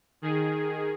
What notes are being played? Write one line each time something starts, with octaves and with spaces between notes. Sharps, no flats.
D#3 G#4